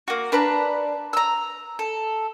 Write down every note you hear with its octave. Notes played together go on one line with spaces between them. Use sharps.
A#3 F#4
D4 B4 A5 A#5
A#5 E6
A4